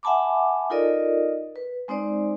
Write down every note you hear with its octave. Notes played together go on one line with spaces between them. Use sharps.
E5 F#5 G#5 A5 B5 D6
D#4 F4 A4 A#4 D5 D#5
B4
G#3 C4 D#4 C5 D5